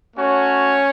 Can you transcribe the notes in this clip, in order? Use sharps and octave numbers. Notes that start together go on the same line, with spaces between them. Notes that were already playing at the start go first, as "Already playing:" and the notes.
A3 C#4 F#4 C#5